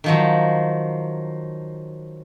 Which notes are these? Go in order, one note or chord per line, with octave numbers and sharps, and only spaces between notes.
D#3 F3 F#3